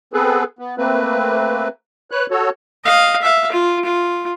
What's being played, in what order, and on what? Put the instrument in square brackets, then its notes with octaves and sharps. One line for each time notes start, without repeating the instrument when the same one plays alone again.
[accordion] B3 C4 G#4 A4 B4
B3
A3 A#3 C4 B4
B4 C#5 F#6
F#4 A4 C#5
[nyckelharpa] D#5 F5
E5 F5
F4
F4